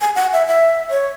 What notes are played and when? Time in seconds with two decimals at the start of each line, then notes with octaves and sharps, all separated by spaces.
0.01 G#5
0.15 F#5
0.33 E5
0.46 E5
0.90 C#5